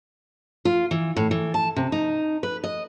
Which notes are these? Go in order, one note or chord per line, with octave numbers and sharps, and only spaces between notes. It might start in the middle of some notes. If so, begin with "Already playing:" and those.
F4
E3
A2
E3
A5
C3
D#4
B4
D#5